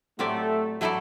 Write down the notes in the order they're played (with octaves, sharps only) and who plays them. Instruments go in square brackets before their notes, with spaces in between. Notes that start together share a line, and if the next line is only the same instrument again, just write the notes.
[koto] A2 F#3 C4 G4 D5 [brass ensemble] A3
[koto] F#3 A3 E4 A4 D5